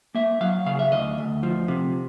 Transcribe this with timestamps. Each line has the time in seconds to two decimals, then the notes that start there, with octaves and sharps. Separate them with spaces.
0.15 A#3 E5
0.41 F#3 F5
0.66 C#3 F5
0.79 E5
0.92 D2 D#5
1.18 D2
1.43 F3
1.68 C3